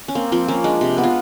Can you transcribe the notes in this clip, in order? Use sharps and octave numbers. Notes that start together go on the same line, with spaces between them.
C#4
A#3 C4
F3 C4
A#3 C#4
G#3 D4
C3
B3
F4